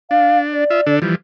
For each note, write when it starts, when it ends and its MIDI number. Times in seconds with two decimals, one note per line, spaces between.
0.11 0.64 62
0.11 0.38 77
0.54 0.95 74
0.70 0.81 65
0.70 0.81 76
0.86 0.99 50
0.86 0.99 62
0.86 0.99 69
1.02 1.15 52
1.02 1.15 53
1.02 1.15 55